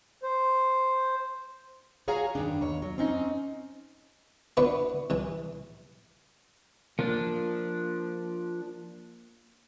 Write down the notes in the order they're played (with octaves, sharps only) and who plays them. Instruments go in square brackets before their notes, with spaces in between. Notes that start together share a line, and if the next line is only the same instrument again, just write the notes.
[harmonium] C5
[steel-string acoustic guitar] F#4 G#4 C#5 F5 G#5 A#5
G2 D#3 D4
D#2 C#5
F#3
C4 C#4 D#4
[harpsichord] B3 D4 E4 F#4 B4
C2 E3
[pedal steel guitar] F3 D4 [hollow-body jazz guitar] A#3